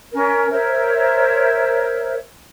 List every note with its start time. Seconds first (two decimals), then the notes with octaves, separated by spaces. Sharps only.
0.12 C#4 A#4
0.50 A#4 C5 C#5 E5